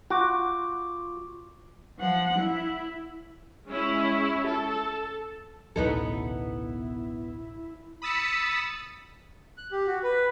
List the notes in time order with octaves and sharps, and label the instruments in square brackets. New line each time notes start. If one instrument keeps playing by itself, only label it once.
[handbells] F4 C#6 D6 [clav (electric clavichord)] F#4
[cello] F3 F#5
E4
[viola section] G#3 C#4 E4
A4
[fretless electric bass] A1 D2 B2 [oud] B3 D#4 A4 [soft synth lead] E4
[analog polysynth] B5 D#6 E6 A6 B6 C#7
[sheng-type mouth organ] F#6
G4
F#4
B4